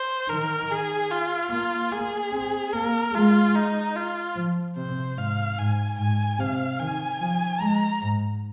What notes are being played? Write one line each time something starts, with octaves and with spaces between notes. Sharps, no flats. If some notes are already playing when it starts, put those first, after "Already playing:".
Already playing: C5
D#3 A#4
G#4
F4
A#3 F4
A#3 G#4
C4
A#3 A#4
G#3 F4
D#4
F4
F3
C3 C5
G#2 F5
G#2 G#5
G#2 G#5
C3 F5
D#3 G#5
F3
G#3 A#5
G#2